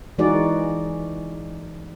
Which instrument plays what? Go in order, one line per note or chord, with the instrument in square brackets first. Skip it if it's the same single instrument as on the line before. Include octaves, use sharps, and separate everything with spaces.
[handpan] E3 G#3 D#4 F#4 G#4 D5